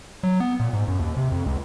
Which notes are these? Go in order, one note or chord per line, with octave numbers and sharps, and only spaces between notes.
F#3
B3
A#2
G#2
F#2
D#2
C3
F2
C#2